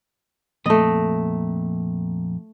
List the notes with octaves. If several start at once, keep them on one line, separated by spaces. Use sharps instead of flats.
F2 A#2 A3 D#5